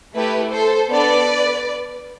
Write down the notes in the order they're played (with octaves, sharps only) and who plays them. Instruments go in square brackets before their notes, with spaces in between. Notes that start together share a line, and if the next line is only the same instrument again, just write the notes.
[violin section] A3 E4 G4 B4
A4 C5
B3 D4 A4 B4 D5